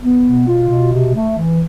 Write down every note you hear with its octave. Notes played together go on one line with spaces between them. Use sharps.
B3
B2
F4
B2
C3
A3
E3